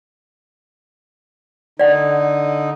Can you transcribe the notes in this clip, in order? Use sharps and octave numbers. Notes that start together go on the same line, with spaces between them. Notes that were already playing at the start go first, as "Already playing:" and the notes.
D3 D#4 D5 F#5